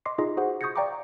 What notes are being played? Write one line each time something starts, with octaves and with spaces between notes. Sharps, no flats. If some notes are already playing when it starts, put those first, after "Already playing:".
D#5 C6 D6 C7
D#4 F4 G#4 D#5
F#4 G#4 C5 F#5
C#6 D#6 G6 G#6 A#6 C#7
D5 F5 G5 A#5 C#6 D6